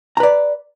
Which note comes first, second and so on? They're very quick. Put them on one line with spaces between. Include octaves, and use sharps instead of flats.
A#5 B4 D5